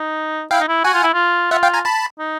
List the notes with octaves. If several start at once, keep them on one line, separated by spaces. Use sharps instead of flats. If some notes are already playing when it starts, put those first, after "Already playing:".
Already playing: D#4
E4 F5 G5
D#4
E4
F#4 F#5 G#5
F4
E4
F4
F4 E5 F#5
F5 G5
G#5 A#5
A5 B5
D#4